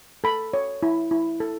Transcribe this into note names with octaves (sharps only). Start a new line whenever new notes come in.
A4 B5
C#5
E4
E4
A4